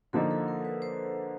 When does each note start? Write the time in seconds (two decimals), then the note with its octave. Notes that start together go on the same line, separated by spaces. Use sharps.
0.13 D3 F3 A#3 D#4 A4
0.31 A4
0.48 A#4
0.65 B4
0.82 C5